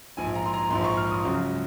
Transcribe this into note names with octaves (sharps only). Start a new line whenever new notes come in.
A#1 G#2 F3 G#5
A#5
C6
A#5
A#1 G#2 F3 C6
C#6
F6
D#6
C#2 C#3 F#3